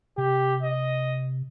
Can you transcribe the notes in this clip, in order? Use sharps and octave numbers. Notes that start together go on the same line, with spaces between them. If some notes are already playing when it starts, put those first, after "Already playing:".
C3 G4
D#5